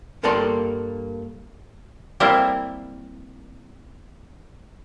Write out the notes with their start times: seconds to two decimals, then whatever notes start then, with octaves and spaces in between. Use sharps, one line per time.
0.23 G2 A#3 A4 D5 A5 C6
2.20 G3 A#3 C4 E4 A#4